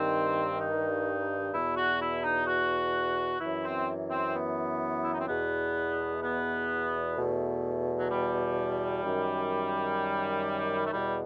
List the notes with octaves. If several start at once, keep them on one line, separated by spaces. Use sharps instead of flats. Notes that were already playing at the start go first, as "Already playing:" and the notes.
Already playing: G2 D#3 C4
D#4
E2 B2 E4
F#4
E4
D#4
F#4
F#2 E3 E4
C4
C4
B3
E4
D#4
C4
E2 B2 B3
B3
E2 B2 A3
F#3
G3
F#2 D#3
A3
E2 B2 G3